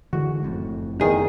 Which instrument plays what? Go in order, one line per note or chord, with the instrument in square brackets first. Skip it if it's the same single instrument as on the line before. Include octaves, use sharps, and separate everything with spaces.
[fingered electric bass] D3 E3 G#3 [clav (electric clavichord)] F#4
[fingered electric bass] F#1 F2 A2
[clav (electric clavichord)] E2 D#3 [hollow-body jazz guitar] G#4